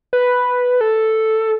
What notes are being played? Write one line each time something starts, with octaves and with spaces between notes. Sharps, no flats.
B4
A4